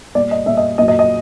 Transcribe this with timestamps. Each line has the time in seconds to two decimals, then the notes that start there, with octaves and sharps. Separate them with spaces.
0.15 A#2 G3 D5
0.31 D#5
0.46 A#2 G3 E5
0.57 D#5
0.78 A#2 F#3 D#5
0.88 D#5
0.99 D#5